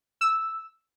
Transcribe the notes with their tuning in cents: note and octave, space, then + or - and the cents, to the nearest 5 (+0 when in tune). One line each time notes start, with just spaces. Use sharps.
E6 -5